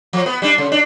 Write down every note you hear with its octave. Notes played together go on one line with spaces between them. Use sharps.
F3
B3
G3 D4
C#3
D4